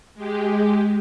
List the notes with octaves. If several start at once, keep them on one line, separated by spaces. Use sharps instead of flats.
G#3 G4